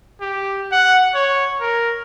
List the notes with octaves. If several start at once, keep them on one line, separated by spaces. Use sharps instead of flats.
G4
F#5
C#5
A#4